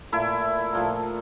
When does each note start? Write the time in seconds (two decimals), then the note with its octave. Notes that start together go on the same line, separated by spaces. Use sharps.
0.12 A#2 A3 E4
0.73 A#2 F3 A3